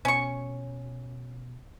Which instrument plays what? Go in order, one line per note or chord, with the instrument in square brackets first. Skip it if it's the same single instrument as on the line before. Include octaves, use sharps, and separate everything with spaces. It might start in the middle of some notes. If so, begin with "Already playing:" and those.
[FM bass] B2 [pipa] C#4 C#6